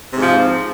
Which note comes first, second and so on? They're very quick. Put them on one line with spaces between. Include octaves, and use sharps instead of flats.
C3 G#2 F3